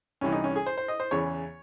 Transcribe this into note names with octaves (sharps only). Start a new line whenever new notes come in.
C2 C3 E3 C#4
D#4
C#4
G#4
C5
C5
D#5
C5
E2 C#3 E3 C#5